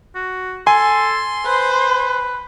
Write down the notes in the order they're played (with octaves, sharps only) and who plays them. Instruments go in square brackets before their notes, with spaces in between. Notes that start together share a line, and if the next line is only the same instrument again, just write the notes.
[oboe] F#4
[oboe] A4 [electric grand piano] G#5 [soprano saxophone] C6
[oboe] B4 [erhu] C5